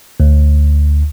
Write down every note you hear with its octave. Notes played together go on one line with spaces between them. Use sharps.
D2